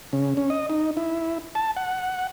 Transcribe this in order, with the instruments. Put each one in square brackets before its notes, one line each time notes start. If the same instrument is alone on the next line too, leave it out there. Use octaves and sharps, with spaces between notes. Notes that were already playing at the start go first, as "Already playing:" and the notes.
[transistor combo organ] C#3
C#4
D#5
D#4
E4
A5
F#5